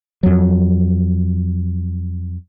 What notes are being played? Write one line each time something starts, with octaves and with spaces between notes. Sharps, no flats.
F2 F#3